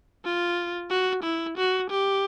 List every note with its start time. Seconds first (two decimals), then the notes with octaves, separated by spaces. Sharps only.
0.25 F4
0.90 F#4
1.24 E4
1.57 F#4
1.90 G4